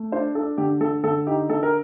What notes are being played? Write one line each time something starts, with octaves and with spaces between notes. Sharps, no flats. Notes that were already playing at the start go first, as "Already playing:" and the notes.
Already playing: A3
D4 C5
D4 A4
D3 G4
D3 A4
D3 A4
D#4 G4
D3 A4
A#4